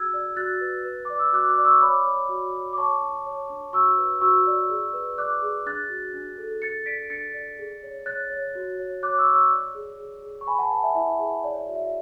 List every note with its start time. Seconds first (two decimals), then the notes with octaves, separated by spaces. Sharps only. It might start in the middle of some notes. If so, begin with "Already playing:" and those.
Already playing: F#4 G#4 E6 G#6
0.13 D5
0.37 F#4 F#6 A6
0.61 B4
0.85 B4
1.05 D5 D6
1.19 E6
1.33 F#4 D6 F#6
1.49 D6 F#6
1.58 D5
1.65 C#6 E6
1.81 C#5 B5 D6
2.06 C#5
2.29 F#4
2.53 C#5
2.73 D6
2.78 C#5 A5 C#6
3.02 D4
3.26 C#5
3.50 D4
3.73 F#4 C#6 E6
3.98 B4
4.21 F#4 C#6 E6
4.47 D5
4.70 G#4
4.93 B4
5.17 D5 D6 F#6
5.42 G#4
5.66 D4 F#6 A6
5.90 F#4
6.14 D4
6.38 A4
6.62 G#4 A6 C#7
6.86 D5 B6 D7
7.10 D4 A6 C#7
7.34 D5
7.59 G#4
7.83 C#5
8.06 C#5 F#6 A6
8.30 C#5
8.55 F#4
8.79 C#5
9.02 C#5 D6 F#6
9.18 C#6 E6
9.27 C#5
9.34 C#6 E6
9.51 D5
9.75 G#4
10.00 G#4
10.22 G#4
10.41 C#6
10.46 B4 G#5 B5
10.58 F#5 A5
10.71 B4 F#5 A5
10.83 E5 G#5
10.95 E4 E5
11.19 G#4
11.44 C#5 D5
11.59 E5
11.68 F#4
11.75 E5